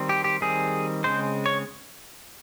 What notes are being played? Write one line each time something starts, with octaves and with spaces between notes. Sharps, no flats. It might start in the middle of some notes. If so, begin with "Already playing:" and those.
Already playing: D#3 G3 C4
G4
G4
D#3 G3 C4 G#4
C#3 G#3 C4 C5
C#5